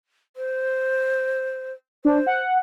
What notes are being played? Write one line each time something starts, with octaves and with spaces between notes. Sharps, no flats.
C5
D4 C5
F#5